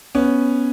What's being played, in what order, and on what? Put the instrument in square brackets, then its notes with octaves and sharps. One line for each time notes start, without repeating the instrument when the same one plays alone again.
[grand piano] B3 C#4